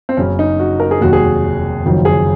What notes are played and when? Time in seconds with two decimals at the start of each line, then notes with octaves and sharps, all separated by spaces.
0.09 C4
0.17 F#1 F#2 C#3 C#4
0.39 D#4
0.59 F#4
0.80 A#4
0.91 G#4
1.01 F1 D#2 D#3 F#3 F#4
1.13 G#4
1.85 F#1 F2 D#3 F#3
2.05 G#4